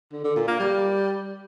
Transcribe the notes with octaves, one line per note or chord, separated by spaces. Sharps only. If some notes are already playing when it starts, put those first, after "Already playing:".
D3
D3
A#2
A#3
G3